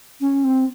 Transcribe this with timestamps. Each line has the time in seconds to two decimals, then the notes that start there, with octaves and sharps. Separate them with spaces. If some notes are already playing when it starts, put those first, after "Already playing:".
0.21 C#4
0.44 C4